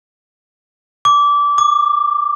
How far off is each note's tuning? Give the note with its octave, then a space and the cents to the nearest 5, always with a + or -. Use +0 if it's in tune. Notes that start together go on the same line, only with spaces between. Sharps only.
D6 -20
D6 +20